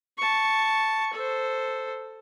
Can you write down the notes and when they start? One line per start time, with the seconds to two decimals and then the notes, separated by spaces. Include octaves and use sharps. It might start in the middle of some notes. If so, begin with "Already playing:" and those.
0.18 A5 C#6
1.13 A4 C5